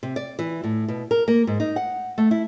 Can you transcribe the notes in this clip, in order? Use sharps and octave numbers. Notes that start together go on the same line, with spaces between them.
C3
D5
E3
A2
B2
A#4
A#3
G#2
D#4
F#5
A3
E4